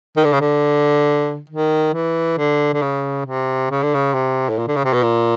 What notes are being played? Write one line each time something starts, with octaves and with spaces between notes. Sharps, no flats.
D#3
D3
C#3
D3
D#3
E3
D3
D3
C#3
C3
C#3
D3
C#3
C3
A2
A#2
D3
C#3
C3
B2
A#2